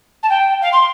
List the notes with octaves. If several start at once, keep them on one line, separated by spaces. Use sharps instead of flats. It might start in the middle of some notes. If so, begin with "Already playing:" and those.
A5
G5
F5
C6